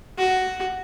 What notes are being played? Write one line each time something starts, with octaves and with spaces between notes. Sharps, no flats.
F#4